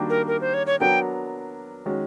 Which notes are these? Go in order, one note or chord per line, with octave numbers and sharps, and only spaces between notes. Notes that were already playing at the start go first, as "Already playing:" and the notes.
Already playing: D#3 G3 A#3 D4 F#4
A#4
A#4
C5
C#5
C#5
F#3 B3 D4 F#4 A#4 G5
D#3 G#3 C#4 F#4